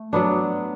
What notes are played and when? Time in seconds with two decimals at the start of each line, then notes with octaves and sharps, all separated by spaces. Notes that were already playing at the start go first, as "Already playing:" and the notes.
Already playing: A3
0.13 F#3 B3 D4